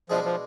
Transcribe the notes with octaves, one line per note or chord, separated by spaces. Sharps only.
B2 F3 G#3 D4 G#4
F3